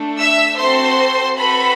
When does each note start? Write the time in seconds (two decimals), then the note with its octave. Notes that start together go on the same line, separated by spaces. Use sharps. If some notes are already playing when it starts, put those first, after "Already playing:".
Already playing: A3 D4 A4
0.18 E5 E6
0.58 C4 F#4 A4 C5 C6
1.37 C4 F#4 A4 B4 B5